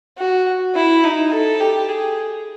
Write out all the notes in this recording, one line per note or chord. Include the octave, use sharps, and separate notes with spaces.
F#4
E4
D#4
A4
G4
G#4